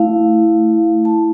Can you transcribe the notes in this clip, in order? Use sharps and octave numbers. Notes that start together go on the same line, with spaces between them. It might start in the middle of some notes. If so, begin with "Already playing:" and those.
Already playing: A3 E4 F5
A5